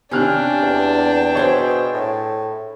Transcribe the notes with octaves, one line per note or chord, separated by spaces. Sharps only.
C3 C#4 D4 F5 G5 F6 F#6
E2
B2 G#4 C5 C#5 E5
A2